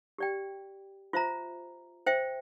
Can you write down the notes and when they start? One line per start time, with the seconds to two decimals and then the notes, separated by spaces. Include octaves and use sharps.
0.18 G4 D5 G5
1.13 F4 C5 E5 A#5
2.06 C5 E5 G5